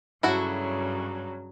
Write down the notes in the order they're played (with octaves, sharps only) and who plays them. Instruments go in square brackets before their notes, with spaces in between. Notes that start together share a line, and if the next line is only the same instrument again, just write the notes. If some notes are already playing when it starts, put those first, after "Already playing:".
[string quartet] G2 C#3 F#3 [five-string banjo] E4 F#4 A4